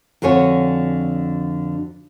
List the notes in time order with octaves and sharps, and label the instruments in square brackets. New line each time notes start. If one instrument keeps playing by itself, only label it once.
[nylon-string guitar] F2 D3 F#4 C#5 G#5